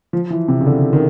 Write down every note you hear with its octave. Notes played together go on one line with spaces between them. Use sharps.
F3
E3
C3
C#3
D3
D#3